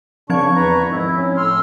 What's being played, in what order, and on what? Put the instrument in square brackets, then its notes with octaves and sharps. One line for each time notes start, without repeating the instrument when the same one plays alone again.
[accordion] C#3 D4 [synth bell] F3 C4 G#6 [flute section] C#6
[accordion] E2 B4 A#5
[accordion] G#2 D#3 [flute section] E4
[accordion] C#4
[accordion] A2 C6 F6 [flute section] E6